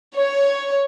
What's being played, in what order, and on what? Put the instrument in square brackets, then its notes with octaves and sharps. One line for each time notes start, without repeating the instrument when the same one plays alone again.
[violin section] C#5